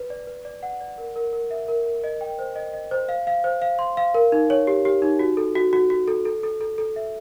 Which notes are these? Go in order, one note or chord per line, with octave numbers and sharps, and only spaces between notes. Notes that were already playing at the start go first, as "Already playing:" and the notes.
Already playing: B4
D5
B4
D5
F#5
D5
A#4
A#4
A#4
E5
A#4
A#4
D#5
G5
C5
D#5
D#5
C5
F5
F5
C5
F5
C6
F5
A#4
D#4
C#5
G4
G4
D#4
F#4
A4
F#4
F#4
F#4
A4
A4
A4
A4
A4
E5